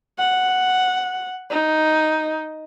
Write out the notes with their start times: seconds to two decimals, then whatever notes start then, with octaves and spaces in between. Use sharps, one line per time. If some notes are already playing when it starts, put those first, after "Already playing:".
0.19 F#5
1.50 D#4